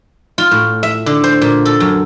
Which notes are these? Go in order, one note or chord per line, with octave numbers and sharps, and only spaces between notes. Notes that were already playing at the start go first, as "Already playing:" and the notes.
F4
A2
E5
D3
C5
A#2
A4
F#2